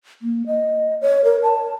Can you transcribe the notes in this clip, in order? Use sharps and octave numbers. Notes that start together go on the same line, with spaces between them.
A#3
D#5
C#5
A#4
A5